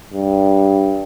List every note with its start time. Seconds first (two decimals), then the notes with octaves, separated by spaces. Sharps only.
0.14 G2